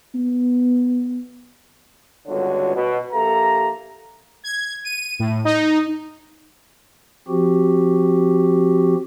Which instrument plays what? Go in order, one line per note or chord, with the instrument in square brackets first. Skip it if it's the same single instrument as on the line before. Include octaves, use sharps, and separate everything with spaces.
[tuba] B3
[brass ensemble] G1 C#2 D3 F#4 C#5
B2
A#1 A#3 G4 A4 E5 A#5
[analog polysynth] G#6
D#7
A2
D#4
[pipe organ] F3 C4 F#4 G4